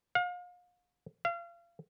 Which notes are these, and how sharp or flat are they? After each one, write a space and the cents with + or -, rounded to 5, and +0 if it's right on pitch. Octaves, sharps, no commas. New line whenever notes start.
F5 +35
F5 -35